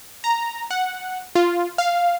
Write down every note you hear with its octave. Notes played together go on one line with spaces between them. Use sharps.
A#5
F#5
F4
F5